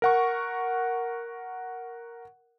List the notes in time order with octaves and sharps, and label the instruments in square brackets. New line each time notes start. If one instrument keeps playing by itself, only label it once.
[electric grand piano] A#4 F#5 C#6